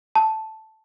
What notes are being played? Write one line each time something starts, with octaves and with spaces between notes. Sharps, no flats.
A5